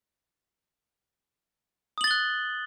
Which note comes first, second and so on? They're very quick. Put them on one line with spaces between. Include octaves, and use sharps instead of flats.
D#6 F#7 A6 G7 F#6